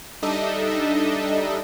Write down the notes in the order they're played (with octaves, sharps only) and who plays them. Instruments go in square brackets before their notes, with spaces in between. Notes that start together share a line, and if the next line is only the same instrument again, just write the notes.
[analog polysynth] G3 D4 D#4 A4 D#5 E5